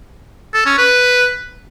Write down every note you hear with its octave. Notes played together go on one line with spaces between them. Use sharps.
A4
C#4
B4